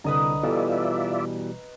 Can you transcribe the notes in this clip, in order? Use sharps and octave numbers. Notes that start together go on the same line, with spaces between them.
C2 D3 B4 D#5 A#5
B2 E3 G3 F4 A4 D5 E5